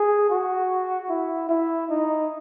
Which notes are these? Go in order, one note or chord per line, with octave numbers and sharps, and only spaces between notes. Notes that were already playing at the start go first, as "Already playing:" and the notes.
Already playing: G#4
F#4
E4
E4
D#4